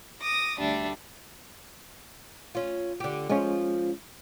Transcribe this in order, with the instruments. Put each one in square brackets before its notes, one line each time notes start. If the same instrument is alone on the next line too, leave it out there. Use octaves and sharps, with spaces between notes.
[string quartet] D6 D#6 A#6
D2 G3 D4 E5
[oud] C#4 F4
D3 G4
[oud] F3 F4 [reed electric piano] G#3 C#4